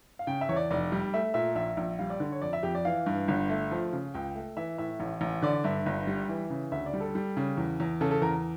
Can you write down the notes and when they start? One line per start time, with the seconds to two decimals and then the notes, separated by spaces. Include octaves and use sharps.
0.19 F5
0.27 C#3 G5
0.41 E5
0.49 E2 C#5
0.56 D5
0.71 F1 D5
0.92 G3
1.14 A3 E5
1.34 A#2 E5
1.55 A#1 E5
1.77 A#1
1.99 G3 F5
2.10 D5
2.20 D3
2.32 C#5
2.42 F2 D5
2.53 E5
2.63 F2 G4
2.75 D5
2.85 E3 F5
3.06 G2
3.28 G1
3.49 A3
3.71 F3
3.93 C#3
4.14 C#2 G5
4.35 A3
4.57 E3 E5
4.78 A2 E5
5.00 A1
5.21 A1
5.42 D3 D5
5.64 G2 E5
5.86 G1
6.07 G3
6.29 E3
6.50 C#3
6.72 D2 E5
6.86 D5
6.94 G3
7.00 A4
7.15 G3
7.37 C#3
7.57 E2
7.80 E2
8.01 C#3 A4
8.11 A4
8.22 E2 A#4